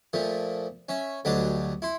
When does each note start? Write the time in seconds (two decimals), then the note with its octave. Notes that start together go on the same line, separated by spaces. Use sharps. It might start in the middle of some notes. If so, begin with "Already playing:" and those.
0.13 A#2 F3 A3
0.89 C#4 E5
1.25 D2 F#3 G3 D4 D#5
1.82 E4 C6